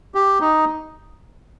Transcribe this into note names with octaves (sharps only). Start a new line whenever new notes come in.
G4
D#4